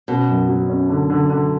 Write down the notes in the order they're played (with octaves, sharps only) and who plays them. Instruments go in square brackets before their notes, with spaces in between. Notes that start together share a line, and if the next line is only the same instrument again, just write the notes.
[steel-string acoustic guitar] B2 [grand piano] C#4
[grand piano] F#2
F#3
C#4
D3
D3
D3